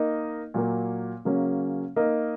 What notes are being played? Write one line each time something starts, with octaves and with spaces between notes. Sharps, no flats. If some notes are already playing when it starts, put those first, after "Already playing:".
Already playing: A#3 D#4 A#4 D#5
A#2 F#3 A#3
C#3 F#3 A#3 C#4
A#3 D#4 A#4 D#5